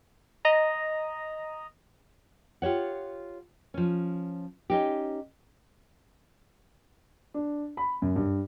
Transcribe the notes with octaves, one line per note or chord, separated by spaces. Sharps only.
D#5 A#5
F4 G4 C#5 F#5
F3 C#4
C#4 D#4 G4
D4
B5
F#2
G2